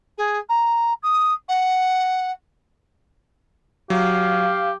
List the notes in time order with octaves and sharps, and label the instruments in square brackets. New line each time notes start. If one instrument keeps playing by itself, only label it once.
[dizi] G#4
A#5
D#6
F#5
[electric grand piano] F#3 [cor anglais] G4 [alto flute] F5